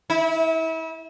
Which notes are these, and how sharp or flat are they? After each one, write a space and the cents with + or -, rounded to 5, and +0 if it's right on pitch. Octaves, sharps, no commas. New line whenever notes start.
E4 -30